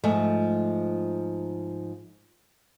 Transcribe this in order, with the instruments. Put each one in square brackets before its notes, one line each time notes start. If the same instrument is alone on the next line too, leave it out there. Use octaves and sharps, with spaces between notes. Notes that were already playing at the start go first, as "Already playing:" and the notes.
[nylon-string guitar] G#2 F3 A3